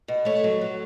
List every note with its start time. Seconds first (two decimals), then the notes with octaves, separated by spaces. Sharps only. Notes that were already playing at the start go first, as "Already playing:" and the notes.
0.08 B2
0.25 A3 C#5
0.44 F#3
0.61 F#3